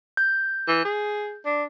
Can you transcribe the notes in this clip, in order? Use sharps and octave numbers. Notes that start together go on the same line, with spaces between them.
G6
E3
G#4
D4